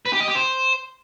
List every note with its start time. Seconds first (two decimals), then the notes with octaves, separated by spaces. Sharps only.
0.06 B4
0.13 G4
0.20 D#5
0.28 G4
0.35 C5